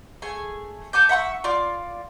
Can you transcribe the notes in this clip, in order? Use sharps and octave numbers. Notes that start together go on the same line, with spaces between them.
A3 G#4 G#5
A4 G#5 D6 G6
E5 F#5 B5 C#6
F4 D5 D6